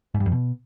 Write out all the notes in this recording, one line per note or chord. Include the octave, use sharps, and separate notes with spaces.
G#2
G2
F2
B2